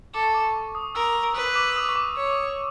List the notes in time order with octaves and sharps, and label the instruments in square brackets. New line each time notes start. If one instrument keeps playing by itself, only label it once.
[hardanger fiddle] A4 [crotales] D6
[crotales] C#6
D6
C#6
D6
D#6
[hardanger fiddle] A#4 [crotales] E6
[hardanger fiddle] B4 [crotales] E6
[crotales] D6
D#6
C#6
D6
[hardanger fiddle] C#5